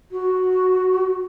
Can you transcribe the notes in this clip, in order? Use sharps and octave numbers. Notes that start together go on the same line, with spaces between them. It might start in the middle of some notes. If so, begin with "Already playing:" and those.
F#4